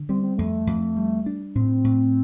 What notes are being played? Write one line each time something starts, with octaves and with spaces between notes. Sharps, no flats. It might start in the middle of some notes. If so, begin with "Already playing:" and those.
Already playing: D3
G3 C4
C4
F2 A3
F2
G3
D4
A2 C4
A2